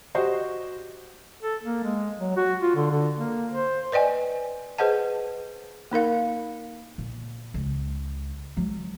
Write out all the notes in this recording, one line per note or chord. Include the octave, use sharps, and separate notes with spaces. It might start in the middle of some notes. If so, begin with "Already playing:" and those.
F#4 G4 C5 D#5
A4
A#3
G#3
F#3
F#4
F4
D3
D3
A#3
C5
B4 D5 D#5 G5 G#5
G#4 B4 C5 D#5 F#5 A5
A#3 D#4 A#4 F5
A#2
C#2
F#3 G#3